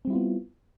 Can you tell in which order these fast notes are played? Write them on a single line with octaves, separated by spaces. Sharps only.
C4 G3 E4 F4 B3